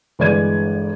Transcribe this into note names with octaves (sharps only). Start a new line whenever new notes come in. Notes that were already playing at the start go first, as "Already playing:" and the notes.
G1 E3 G#3 D5 G#6 D#7